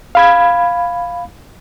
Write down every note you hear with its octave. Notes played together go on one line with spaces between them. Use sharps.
F5 B5 G#6